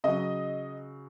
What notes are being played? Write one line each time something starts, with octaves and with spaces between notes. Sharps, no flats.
C#3 F#3 D#5